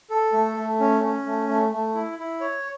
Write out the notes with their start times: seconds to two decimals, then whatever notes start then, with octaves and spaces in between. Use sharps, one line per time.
0.10 A4
0.33 A3
0.57 A3
0.80 C#4
1.03 C#4
1.26 A3
1.49 A3
1.72 A3
1.94 E4
2.19 E4
2.41 C#5